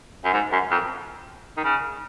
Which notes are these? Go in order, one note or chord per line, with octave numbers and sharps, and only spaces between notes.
F#2
G#2
F#2
F2
D#3
C#3